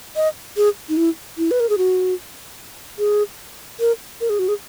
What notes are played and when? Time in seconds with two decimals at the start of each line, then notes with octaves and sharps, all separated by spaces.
0.16 D#5
0.57 G#4
0.89 D#4
0.97 E4
1.38 E4
1.51 B4
1.60 A#4
1.69 G#4
1.78 F#4
2.99 G#4
3.80 A#4
4.21 A#4
4.30 G#4
4.39 F#4
4.48 G#4